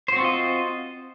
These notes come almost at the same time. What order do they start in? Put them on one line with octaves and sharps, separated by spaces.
C5 F#4 C4 F4 D#5